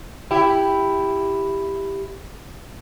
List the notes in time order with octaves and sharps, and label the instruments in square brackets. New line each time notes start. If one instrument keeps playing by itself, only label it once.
[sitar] E4 G4